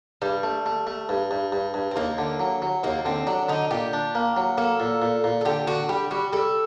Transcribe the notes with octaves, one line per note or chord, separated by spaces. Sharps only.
G2 G3
A3
A3
A3
G2
G2
G2
G2
C4
D#2 A#3
D3
F#3
F#3
D#2 A#3
D3 C4
F#3 D4
D3 D#4
A#2 G4
D4
A#3
F#3
A#3 A4
A#2
A#2
A#2
A4
D3 G4
D3 F#4
G3 G4
G3 F#4
G3 A4